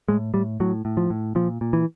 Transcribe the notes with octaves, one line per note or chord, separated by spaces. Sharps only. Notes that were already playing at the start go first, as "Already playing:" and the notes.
A2 G#3
A2 G3
A2 F#3
A2
F3
A2
A#2 F3
A#2
E3